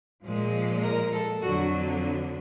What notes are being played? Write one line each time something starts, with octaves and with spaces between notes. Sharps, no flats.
A#2 F3 G#3
A#4
A4
F2 D3 F#3 F#4